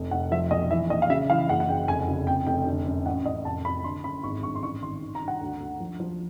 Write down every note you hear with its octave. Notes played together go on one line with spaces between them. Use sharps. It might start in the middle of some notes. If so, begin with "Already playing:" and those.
Already playing: F1
F1 F#5
F3 E5
B1 D#5
E3 E5
A#1 D#5
F5
C#3 E5
E3 F5
F#1 F#5
F#5
F#1 G5
F1 G#5
C#3
F2 G5
F1 G5
D3
F#2
A1 F#5
A1 D#5
F1 A5
F2 B5
D3 C6
F#2 B5
G#1 C#6
G2 C#6
C6
A1 C#6
D#3 C6
D#3
A#5
G2
F#5
D2
D2
F3
F3